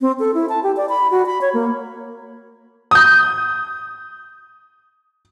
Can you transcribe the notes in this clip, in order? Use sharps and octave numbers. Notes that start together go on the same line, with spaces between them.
C4
A4
E4
A5
G4
D5
B5
F#4
B5
C#5
A#3
D#6 G6